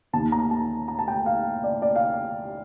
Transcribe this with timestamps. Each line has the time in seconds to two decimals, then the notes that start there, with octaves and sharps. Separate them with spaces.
0.13 D#2 A5
0.17 D#3
0.32 A#5
0.51 A5
0.88 A#5
0.99 A5
1.08 G5
1.26 F5
1.63 D5
1.82 D5
1.96 F5